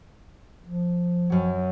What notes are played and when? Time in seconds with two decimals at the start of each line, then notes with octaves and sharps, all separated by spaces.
0.64 F3
1.30 F#2 F#3